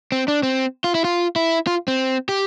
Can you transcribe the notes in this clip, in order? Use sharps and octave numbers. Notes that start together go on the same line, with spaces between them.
C4
D4
C4
F4
E4
F4
E4
F4
C4
G4